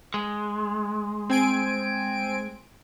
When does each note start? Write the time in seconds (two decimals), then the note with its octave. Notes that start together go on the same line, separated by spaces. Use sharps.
0.14 G#3
1.30 C4 G#5 D7